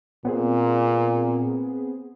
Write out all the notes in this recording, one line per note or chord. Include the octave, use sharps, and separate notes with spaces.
A#2 B3 C4 G#4